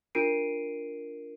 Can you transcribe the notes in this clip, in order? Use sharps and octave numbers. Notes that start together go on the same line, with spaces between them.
D4 F4 A#4 C7 D7 D#7